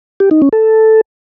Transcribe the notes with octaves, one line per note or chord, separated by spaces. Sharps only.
G4
D#4
C#4
A4